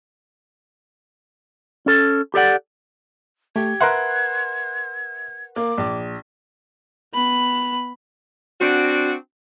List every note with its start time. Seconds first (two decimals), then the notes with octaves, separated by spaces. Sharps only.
1.86 C#4 A4
2.34 G4 A4 D5 F#5
3.56 A3 G4 G#6
3.81 A#4 B4 E5 F#5 C6 F#6
5.56 A#3 D6
5.78 A#1
7.14 B3 B5
8.61 C4 D4 F#4